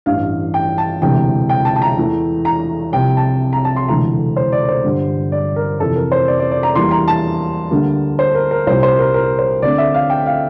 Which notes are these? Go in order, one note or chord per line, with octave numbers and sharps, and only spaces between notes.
A1 G2 E3 F5
G5
A5
E1 D2 C3 E3 G5
G5
A5
A5
A#5
E2 E3 A3
A#5
C2 C3 F3 C4 G5
A5
A#5
A5
C6
E1 D2 C3 E3 A3 A#5
C5
D5
C5
G1 G2 D3 G3
D5
A#4
F2 C3 E3 A4
A#4
C5
D5
D5
D5
A#5
E2 E3 G3 A#3 C6
A#5
A5
D2 D3 G3 A#3
C5
A#4
A#4
C2 A#2 G3 C5
C5
A#4
A#4
C5
D2 D3 A3 C4 D5
E5
F5
G5
F5